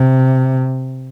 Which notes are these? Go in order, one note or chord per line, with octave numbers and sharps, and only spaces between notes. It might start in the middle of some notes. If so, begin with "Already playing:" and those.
Already playing: C3